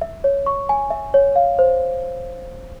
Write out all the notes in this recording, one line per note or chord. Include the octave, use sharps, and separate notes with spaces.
E5
C#5
C#6
G#5
E5
C#5
F5
C5